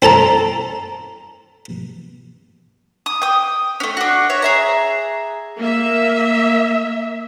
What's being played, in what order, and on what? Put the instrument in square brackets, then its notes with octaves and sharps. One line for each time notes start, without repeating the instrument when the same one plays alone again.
[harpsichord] C4 A4 A5 A#5
[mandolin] D#6
G5 D#6
A3 C#4
D4 F#4
C#5 E5
G#4 E5 A#5
[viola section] A#3 E5